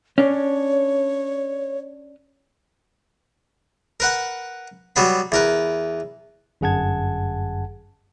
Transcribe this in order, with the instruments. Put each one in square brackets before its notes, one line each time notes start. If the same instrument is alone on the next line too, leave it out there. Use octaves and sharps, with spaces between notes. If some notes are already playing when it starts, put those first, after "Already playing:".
[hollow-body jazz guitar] C#4 D4 [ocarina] C#5
[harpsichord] A#4 B4 F#5
F#3 G3 B3 B5
E2 A#4 B4
[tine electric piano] G1 F#2 G#4 F#5 A5 G#6